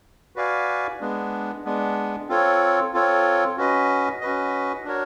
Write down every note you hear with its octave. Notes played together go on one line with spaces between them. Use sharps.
F#4 B4 D5 F5 G#5
G#3 B3 D4
G#3 B3 D4
C4 F4 A4 C#5
C4 F4 A4 C#5
C#4 F#4 B4 D#5
C#4 F#4 B4 D#5
D4 F#4 A#4 C#5